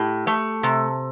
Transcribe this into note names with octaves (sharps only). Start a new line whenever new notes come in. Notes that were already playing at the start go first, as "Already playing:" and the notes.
Already playing: A2 G4
A3
C3